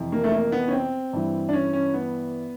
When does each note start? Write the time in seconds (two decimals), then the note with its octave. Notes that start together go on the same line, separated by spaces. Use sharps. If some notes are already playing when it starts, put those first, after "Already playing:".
Already playing: F2 C3 E3
0.12 A#3
0.24 A3
0.32 A#3
0.52 B3
0.68 C#4
0.72 C4
1.13 G2 E3
1.49 D4
1.53 C#4
1.73 C#4
1.94 B3